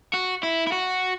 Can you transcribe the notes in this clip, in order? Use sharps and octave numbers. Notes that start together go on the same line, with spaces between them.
F#4
E4
E4
F#4